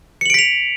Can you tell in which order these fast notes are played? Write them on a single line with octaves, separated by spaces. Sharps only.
C#7 F#7 D7 B6 F7